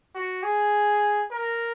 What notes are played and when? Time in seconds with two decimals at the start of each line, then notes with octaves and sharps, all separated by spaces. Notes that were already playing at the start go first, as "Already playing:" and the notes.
0.15 F#4
0.43 G#4
1.31 A#4